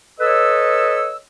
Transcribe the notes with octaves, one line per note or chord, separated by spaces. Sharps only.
A4 B4 C#5 D#5 E6